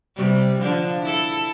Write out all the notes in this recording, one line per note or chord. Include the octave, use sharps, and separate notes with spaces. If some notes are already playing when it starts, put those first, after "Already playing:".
C3 G3
D3 F3 D4
E4 A4